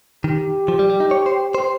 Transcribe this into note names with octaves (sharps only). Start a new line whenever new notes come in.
D#3 G4
F3
G3
G3
D#4
C#5
C5
C5